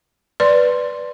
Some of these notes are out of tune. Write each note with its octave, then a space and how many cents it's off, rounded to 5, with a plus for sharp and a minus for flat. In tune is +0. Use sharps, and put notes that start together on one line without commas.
B4 +0 D5 -5 C6 +0